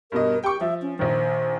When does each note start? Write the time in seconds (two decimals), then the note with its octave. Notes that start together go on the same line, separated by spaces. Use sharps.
0.12 G2 B2 A#4 D#5
0.44 G4 G5 C#6
0.61 F3 E5
0.82 C#4
0.99 A#1 D#3 C5